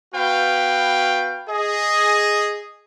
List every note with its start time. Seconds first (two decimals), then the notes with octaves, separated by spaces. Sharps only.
0.13 B3 F#4 B4 F5 G5
1.49 G#4 D#5